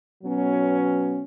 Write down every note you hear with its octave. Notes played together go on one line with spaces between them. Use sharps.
B2 F#3 B3 C#4